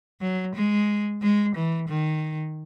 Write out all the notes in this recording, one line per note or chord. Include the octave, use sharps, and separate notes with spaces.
F#3
G#3
G#3
E3
D#3